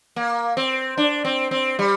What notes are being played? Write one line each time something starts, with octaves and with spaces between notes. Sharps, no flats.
A#3
C4
D4
C4
C4
G3